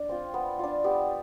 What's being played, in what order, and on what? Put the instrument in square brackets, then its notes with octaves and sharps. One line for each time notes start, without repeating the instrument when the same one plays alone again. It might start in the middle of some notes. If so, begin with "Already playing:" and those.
Already playing: [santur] D4 D5
C4 F4
B3
D4 F4
B3 G4